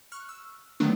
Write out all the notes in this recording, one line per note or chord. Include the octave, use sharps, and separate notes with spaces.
C#6 F6 F#6
E6
D3 D#3 F#3 A3 B3 D4